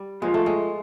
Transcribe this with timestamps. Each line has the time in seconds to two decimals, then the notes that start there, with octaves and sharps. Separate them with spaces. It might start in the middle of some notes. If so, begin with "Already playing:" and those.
Already playing: G3
0.22 A#2 F3 G#3 A#3
0.34 A3
0.46 G#3